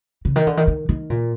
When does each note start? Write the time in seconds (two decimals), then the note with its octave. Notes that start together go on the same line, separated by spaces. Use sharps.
0.25 C#3
0.36 D#3
0.47 D3
0.57 D#3
0.67 D#3
0.89 D#3
1.10 A#2